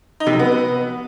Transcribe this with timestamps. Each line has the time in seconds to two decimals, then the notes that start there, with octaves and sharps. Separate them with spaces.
0.20 D#4
0.27 C3
0.33 F#3
0.39 B3